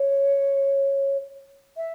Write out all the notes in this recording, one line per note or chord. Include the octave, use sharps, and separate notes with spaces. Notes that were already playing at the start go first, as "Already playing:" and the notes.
Already playing: C#5
E5